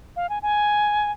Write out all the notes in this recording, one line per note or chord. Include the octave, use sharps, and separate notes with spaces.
F5
G#5
G#5